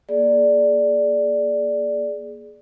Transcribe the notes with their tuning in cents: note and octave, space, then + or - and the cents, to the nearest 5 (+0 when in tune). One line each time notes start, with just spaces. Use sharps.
A#3 +25 G#4 +20 D5 +0